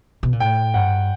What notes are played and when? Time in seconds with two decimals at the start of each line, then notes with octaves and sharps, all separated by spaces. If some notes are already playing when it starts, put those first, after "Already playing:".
0.23 B2
0.33 A#2
0.40 A2 G5
0.74 G2 F#5